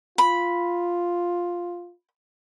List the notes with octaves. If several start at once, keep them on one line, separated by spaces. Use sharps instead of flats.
F4 B5